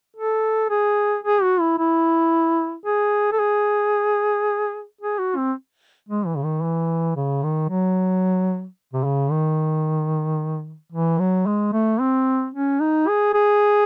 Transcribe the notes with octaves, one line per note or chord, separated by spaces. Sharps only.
A4
G#4
G#4
F#4
E4
E4
G#4
A4
G#4
G#4
F#4
C4
G#3
E3
C#3
D#3
E3
C#3
D#3
F#3
C3
C#3
D#3
E3
F#3
G#3
A3
C4
C#4
D#4
G#4
G#4